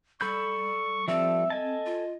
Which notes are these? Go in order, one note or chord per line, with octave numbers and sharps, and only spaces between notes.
G3 A4 B5 C#6 G6
F3 G3 C4 A4 E5
A4 D#5 G#5 A5
F4